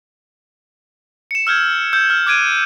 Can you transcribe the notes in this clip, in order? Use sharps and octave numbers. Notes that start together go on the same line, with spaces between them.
C#7 E7
E6 F6 G6 G#6
E6 G6 C#7
F6
D6 F#6 G#6 D7 D#7